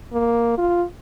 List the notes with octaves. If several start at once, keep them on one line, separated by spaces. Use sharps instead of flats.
A#3
F4